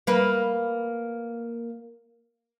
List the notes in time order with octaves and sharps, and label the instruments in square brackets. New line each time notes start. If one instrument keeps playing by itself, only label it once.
[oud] A#3 B4